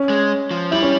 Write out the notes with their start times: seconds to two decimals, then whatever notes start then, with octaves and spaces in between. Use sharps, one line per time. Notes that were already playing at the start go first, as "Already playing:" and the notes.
Already playing: C#4
0.10 G#3
0.51 F3
0.71 G3 E4
0.82 C#4